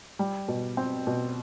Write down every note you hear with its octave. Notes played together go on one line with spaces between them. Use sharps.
G3
B2
C4
B2